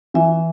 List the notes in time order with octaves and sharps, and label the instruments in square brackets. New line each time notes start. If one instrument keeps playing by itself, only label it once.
[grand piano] E3 [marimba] E5 G#5